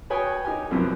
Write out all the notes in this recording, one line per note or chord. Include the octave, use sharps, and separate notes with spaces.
F#4 B4 C#5 G5 G#5 D#6
D#4 G4 A#4 G#5
C2 F#2 F3 F#3 B3 C4